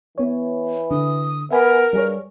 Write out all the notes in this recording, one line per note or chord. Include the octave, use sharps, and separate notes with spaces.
E3 B3 C#5
D3 D#6
B3 A#4 E5 G#5 B5
G2 G3 G#4 C#5